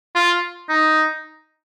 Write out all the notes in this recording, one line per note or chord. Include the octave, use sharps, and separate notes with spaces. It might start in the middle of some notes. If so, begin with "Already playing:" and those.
F4
D#4